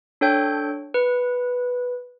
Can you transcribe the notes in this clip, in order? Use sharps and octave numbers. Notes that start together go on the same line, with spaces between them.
D4 A4 C#5 G5 G6
B4